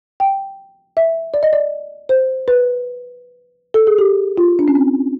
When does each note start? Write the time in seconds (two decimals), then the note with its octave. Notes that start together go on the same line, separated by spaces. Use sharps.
0.20 G5
0.97 E5
1.34 D5
1.43 D#5
1.53 D5
2.09 C5
2.48 B4
3.74 A4
3.87 G#4
3.98 G4
4.38 F4
4.59 D4
4.68 C#4
4.75 C4